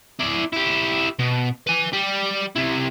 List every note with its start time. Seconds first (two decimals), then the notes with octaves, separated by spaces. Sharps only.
0.19 E4 D5
0.53 E4 G4
1.19 B2
1.67 B4 G#5
1.93 G3 G4
2.56 C3 E4